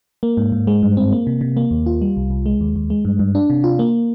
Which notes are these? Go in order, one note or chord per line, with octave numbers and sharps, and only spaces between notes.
A#3
G#2
G#2
G#3
G2
C4
A#3
C3
C3
A#3
D#2
F4
G3
C2
C2
G#3
D#2
D#2
G#3
G2
G2
D4
C3
F4
A#3